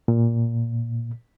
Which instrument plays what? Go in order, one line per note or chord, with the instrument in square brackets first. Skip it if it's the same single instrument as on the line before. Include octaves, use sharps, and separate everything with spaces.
[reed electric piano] A#2